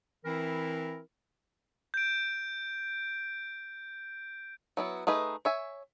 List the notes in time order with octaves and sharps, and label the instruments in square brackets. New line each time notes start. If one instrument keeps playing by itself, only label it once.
[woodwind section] E3 C4 E4 A#4
[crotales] G6 D7
[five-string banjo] F#3 B3 E4
A3 D#4 G#4 B4
C#5 E5 G#5